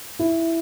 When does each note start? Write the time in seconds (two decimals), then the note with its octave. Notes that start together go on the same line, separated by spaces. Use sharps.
0.19 E4